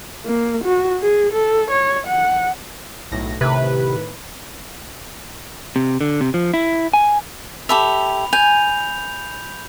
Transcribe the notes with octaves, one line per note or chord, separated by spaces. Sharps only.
A#3
F#4
G#4
A4
C#5
F#5
B1 A2 A#6
A2 C3 D#3 B4
C3
D3
C3
F3
E4
G#5
G4 A4 E5 B5 F7
G#5 G6 F7